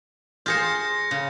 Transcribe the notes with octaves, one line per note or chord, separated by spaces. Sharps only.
F4 G#4 C5 G6 A#6 C#7
C#3